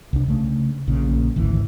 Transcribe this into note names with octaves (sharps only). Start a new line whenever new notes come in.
C2 D4
C#3 A3
A#1 A#2 C#3
G#1 D2 E3